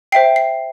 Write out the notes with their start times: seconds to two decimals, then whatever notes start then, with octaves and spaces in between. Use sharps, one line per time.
0.12 C5 E5 G5 C7
0.36 C7